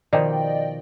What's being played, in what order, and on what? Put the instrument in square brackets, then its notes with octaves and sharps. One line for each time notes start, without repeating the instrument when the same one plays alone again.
[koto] B2 D#3 F3 [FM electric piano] D5 D#5 G5